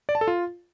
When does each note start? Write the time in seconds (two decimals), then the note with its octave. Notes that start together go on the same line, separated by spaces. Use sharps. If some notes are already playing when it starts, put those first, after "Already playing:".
0.09 D5
0.15 A5
0.21 A4
0.28 F4